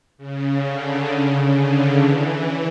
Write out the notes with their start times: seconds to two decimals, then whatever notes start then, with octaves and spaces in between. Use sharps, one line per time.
0.18 C#3
0.63 D3
1.08 C#3
1.53 D3
1.98 E3